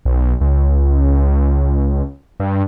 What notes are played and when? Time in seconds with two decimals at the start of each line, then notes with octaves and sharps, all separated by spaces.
0.05 B1
0.41 C#2
2.40 G2